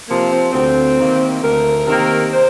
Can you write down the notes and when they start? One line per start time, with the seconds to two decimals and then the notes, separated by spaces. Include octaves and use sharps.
0.08 C3 F3 A#3
0.31 C4
0.53 D2 C4
0.98 C3 D#3 A#3
1.43 D2 A#4
1.87 C3 D#3 A#3
2.33 C5